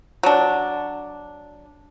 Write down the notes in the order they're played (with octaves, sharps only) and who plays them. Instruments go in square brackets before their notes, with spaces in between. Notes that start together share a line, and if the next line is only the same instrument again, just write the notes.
[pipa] F#3 D4